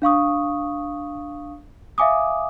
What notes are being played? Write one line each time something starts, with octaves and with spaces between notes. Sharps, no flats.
D4 F5 C#6 D#6
E5 F5 G#5 D6 D#6